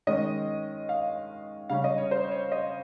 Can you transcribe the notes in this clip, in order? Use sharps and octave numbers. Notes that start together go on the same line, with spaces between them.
D#3 G#3 C#4 D#5
F5
C#3 G3 C#4 F5
D#5
C#5
C5
C#5
D#5